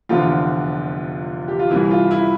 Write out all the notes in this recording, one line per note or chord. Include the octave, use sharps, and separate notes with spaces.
F1 E2 D3 F3 F4
G4
F4
C2 C3 E3 E4
F4
E4